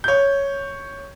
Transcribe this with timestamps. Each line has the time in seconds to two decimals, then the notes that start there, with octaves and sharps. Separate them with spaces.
0.04 C#5 G6